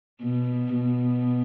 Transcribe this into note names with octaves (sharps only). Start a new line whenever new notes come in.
B2
B2